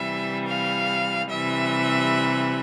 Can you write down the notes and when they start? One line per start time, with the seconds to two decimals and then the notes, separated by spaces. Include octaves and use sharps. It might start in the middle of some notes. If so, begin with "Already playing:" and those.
Already playing: C3 E3 G3 E5
0.48 F5
1.30 C3 E3 G3 E5